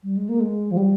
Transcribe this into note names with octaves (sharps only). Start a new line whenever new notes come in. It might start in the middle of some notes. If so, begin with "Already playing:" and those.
G3
G#3
A#3
G#3
F3
G3